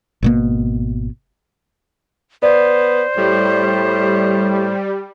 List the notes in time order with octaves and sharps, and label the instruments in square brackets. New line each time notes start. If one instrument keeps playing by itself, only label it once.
[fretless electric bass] G#1 B2 A#3
[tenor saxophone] B3 [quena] C5 [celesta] D5
[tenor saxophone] A2 [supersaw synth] G3